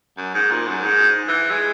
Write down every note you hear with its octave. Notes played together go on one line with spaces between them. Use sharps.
F#2
G#2
A#2
F#2
G#2
E3
G#3